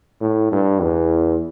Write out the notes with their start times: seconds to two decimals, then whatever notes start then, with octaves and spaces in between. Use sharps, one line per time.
0.20 A2
0.52 G2
0.81 E2